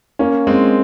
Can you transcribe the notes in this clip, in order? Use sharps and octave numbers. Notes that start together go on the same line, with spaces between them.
A#3 C#4
G#3 C4